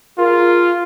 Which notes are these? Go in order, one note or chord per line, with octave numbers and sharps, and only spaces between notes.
F4 G#4 A#4